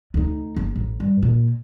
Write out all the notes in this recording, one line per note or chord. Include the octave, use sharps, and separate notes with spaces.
D2 D#4
F#1
A1
G2
A#2